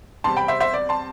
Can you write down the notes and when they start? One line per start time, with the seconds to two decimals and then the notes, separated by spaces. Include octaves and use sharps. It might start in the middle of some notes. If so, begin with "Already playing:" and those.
0.24 E2 C3 G3 C4 A5 C6
0.37 G5 B5
0.48 C5 E5
0.60 C5 E5
0.74 D5
0.89 A5 C6